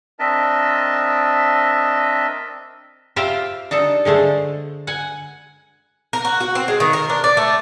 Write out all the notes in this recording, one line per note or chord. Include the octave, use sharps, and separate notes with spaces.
C4 D4 A#4 D#5 E5 A5
F4 G4 C5 E5 F5 G5
D4 D#4 A4
D3 G#3 A3 C5
F#5 G#5
A#4
F#4
F#4
C4
G#3
D#3
A#4
D4
D5
A3